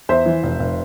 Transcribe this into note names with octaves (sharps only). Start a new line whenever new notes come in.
E2 C5 E5
E3
F1
F1